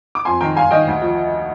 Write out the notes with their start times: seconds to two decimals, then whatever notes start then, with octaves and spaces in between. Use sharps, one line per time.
0.15 D6
0.25 F2 G#5 C6
0.41 D#3 G5 A#5
0.56 G2 F5 G#5
0.71 D#3 D#5 G5
0.87 D2
1.02 F3